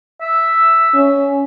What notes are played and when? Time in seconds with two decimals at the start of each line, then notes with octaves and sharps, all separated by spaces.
0.22 E5
0.95 C#4